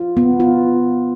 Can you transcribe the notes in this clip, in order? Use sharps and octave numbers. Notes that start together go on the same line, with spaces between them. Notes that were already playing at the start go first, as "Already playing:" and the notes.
Already playing: F4
B3
F4